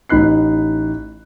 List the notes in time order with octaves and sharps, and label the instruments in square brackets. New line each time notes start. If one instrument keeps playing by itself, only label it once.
[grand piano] A1 D#4 B5 F#6 C7